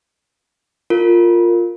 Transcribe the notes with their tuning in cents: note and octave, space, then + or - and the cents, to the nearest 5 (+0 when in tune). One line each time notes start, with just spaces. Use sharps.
F4 +0 A#4 -15